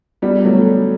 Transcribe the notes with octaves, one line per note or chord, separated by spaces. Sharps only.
G3 B3
F#3 A3